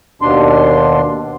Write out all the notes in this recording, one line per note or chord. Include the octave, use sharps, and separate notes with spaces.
D#2 B2 D4 C6